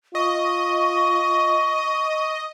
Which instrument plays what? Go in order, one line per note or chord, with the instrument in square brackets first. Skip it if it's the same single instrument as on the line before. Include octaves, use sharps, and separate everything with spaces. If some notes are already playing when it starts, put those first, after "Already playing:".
[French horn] F4 [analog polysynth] D#5 [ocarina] C#6